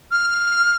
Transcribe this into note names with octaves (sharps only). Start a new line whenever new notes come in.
F6